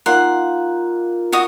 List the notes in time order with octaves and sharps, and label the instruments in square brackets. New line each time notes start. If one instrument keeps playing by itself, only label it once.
[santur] A#3 D#4 F4 [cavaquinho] F#5 C6
[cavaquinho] F#4 D#5 D#6